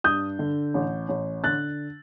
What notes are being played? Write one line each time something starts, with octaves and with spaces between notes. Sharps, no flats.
G2 D#6 G6
D3
A1
A1
D3 F#6 A6